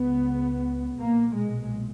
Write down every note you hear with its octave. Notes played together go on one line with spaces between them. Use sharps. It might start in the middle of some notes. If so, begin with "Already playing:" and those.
Already playing: C#2 C#3 B3
B1 A#2 A#3
G#3